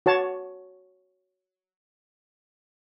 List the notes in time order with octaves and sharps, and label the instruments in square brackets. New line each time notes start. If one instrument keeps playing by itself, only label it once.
[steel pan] F#4 C#5 A5